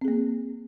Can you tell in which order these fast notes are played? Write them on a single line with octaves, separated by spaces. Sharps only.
C4 G#4 A#3